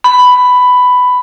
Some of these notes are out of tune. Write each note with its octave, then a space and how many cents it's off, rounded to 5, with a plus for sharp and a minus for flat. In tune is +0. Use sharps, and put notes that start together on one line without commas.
B5 +10